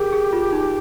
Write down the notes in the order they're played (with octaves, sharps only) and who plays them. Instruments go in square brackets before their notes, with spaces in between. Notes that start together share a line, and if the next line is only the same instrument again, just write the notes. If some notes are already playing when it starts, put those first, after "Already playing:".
Already playing: [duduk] G4 [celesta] G#4 A#4
[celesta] G#4
F4
D#4